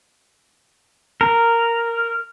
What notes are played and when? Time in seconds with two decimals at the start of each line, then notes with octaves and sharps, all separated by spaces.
1.21 A#4